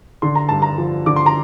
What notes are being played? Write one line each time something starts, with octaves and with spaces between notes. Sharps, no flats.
D3 C6
A#5
G2 A5
A#5
F3
D3 D6
C6
A#5